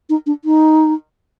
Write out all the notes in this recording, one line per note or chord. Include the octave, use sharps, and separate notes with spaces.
D#4
D4
D#4